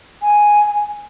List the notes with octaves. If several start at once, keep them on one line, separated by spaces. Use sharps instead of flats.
G#5